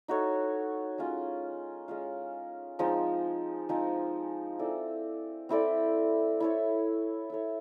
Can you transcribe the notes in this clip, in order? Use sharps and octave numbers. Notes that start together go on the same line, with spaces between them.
D#4 F#4 A4 C#5
G#3 C#4 F4
G#3 C#4 F4
F3 G#3 C4 D#4
F3 G#3 C4 D#4
C4 E4 A4 D5
C4 E4 A4 D5
E4 A4 C#5
E4 A4 C#5